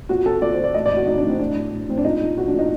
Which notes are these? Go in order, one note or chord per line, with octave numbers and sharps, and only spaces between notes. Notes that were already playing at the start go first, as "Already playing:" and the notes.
A#2 F#4
A#2 A4
A#2 D5
C5
A#2
D5
A2 D#5
D5
A2
F#4
A2 D#4
D4
A2
C4
A2 D4
A2
A2
A2 C4
D4
A#2 D#4
A#2
A#2 F#4
D4
A#2 D#4